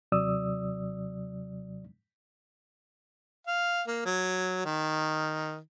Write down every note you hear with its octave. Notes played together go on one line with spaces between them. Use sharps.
D#2 C3 F#3 D5 D#6 E6
F5
A#3
F#3
D#3